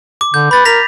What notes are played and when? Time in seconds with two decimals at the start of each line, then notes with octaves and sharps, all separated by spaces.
0.21 D6
0.34 D3 G6
0.51 B4 B5 A6
0.65 A#4 A#6 B6 F7